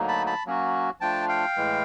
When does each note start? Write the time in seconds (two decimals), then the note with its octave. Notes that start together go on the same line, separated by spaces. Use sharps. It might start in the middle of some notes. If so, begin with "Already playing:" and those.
Already playing: D2 D3 F#3 A#3 D#4
0.08 A5 B5
0.26 A5 B5
0.46 F#3 A#3 C#4 F#4
1.00 F3 A3 D4 F4 G5 A5
1.28 F5 G5
1.56 A2 E3 G#3